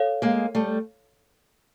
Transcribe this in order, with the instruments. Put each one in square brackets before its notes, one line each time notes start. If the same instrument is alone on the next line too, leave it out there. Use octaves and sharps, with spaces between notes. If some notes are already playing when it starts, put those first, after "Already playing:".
Already playing: [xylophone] A4 C#5 F5
[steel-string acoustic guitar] G#3 A#3
G3 A3